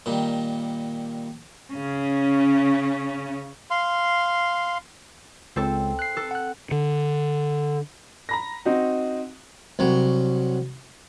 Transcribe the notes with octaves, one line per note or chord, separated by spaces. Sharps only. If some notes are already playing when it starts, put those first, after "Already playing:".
A#2 D#3 G3
C#3 C#4
F5 C6
C#2 C4 A4
F#6 C7
A4
F#5 F#6
D3
A#5 B5 A#6
C4 D#4 F#4
C2 F#3